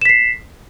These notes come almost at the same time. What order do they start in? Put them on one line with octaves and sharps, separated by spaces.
E7 B6 C7